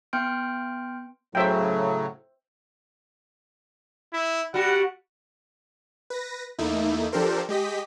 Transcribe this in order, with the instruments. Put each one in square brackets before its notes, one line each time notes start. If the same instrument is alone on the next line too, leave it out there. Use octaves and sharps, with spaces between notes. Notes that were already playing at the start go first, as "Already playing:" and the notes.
[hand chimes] B3 G5 C6 F6 G6 D7
[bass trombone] A2 [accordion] C#3 F#3 [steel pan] C5 E5 G5
[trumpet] E4
[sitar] G3 F#4 [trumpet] F#5
[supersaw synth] B4 A#6
E2 A3 A#3 D#4 E4
F3 D4 G4 A4 A#4 C5
G#3 G4 D#5 B6